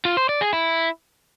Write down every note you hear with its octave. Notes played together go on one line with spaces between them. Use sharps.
F4
C5
D5
G#4
E4